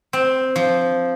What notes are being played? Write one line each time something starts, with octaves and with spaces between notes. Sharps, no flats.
C4
F3